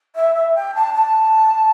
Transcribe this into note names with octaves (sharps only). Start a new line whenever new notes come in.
E5
E5
G5
A5
A5